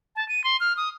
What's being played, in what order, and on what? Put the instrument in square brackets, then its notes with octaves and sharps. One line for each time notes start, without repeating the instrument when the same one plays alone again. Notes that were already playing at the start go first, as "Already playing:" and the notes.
[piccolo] A5
D#7
C6
F6
D#6